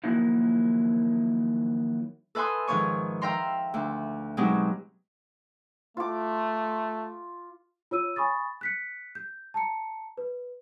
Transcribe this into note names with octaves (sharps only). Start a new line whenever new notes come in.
D#3 F3 F#3 A#3 D#4 E4
A4 B4 E5 G#5 C6 D#6
G#2 D#3 F3 C#5 C#6
E5 F5 G5 A#5 C6
D2
B2 F#3 G#3 C4 D#4 G4
A3 F4 D6
F4 C#5 E6 D#7
G#5 B5 C#6 D#6 A6
F#6 B6 C#7
G6
A5 A#5 C#7
B4